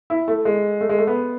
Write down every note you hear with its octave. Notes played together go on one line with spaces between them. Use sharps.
E4
A3
G#3
A3
G#3
A3
B3